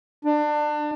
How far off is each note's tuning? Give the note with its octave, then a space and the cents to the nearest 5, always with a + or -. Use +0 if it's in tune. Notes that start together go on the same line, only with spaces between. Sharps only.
D4 +25